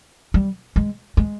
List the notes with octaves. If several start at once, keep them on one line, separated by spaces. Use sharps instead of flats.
G3
G#3
G#3